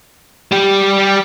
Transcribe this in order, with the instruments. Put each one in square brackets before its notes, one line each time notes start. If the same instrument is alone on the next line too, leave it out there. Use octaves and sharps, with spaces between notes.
[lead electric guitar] G3 G4